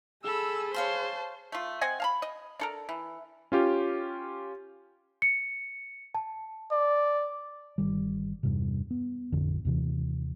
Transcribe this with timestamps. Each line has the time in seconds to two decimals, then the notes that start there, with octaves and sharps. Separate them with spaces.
0.24 G#4 A4 B5 E6
0.74 C5 C#5 F5 A5 C6
1.52 A3 F4
1.81 C4 D#5 F#5 G#5
2.00 F5 A5 B5
2.22 D#5
2.60 D4 A4 A#4
2.89 E3
3.52 C#4 F4 G4
5.22 C#7
6.15 A5
6.71 D5
7.78 G1 D#3 G3
8.43 E2 G2 C3
8.91 B3
9.32 A1 F2 D3
9.65 D#2 C3 E3